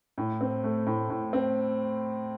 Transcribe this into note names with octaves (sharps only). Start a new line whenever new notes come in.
A2
C4
A3
A2
A2
C4